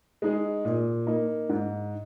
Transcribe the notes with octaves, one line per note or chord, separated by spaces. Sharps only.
G#3 D#4 G#4
A#2
A#3 D#4
G#2